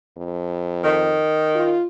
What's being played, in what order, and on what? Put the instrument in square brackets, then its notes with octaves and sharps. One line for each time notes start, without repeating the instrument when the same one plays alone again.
[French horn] F2
[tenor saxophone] D#3
[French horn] F4